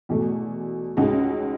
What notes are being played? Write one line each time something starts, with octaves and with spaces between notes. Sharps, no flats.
E2 B2 A3
C#2 C#3 G#3 D#4 F#4